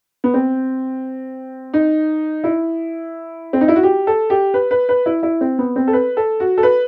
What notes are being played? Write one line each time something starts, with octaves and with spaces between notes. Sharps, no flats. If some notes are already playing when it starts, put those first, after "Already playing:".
B3
C4
D#4
E4
C4
D#4
E4
F#4
G4
A4
G4
B4
B4
B4
E4
E4
C4
B3
C4
A4
B4
A4
F#4
A4
B4